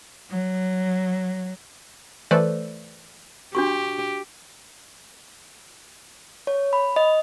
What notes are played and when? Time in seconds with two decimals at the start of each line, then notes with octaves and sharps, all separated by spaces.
0.31 F#3
2.31 E3 A3 A4 B4 C5 D5
3.55 D4 F#4 G4 C#6
6.47 C#5
6.73 B5
6.96 D#5